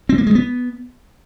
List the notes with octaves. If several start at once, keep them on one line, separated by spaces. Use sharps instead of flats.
C4
A#3
G#3
B3